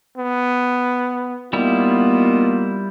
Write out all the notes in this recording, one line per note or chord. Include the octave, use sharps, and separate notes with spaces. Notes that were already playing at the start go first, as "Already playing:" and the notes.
B3
D#3 G3 A#3 B3 E4 F4